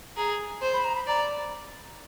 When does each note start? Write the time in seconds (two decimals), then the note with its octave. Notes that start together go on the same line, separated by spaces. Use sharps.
0.17 G#4 A#5
0.62 C5
0.73 B5
0.84 A#5
0.95 B5
1.07 D5 A#5